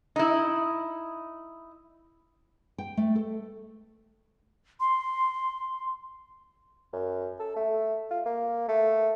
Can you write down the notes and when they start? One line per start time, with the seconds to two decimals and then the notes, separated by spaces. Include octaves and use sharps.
0.16 D#4 E4
2.78 G5
2.97 A3
3.15 A4
4.80 C6
6.93 F#2
7.40 A4
7.56 A3
8.11 F4
8.26 A#3
8.68 A3